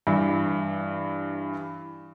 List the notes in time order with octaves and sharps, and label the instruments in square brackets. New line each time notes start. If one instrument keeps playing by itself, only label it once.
[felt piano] G2 E3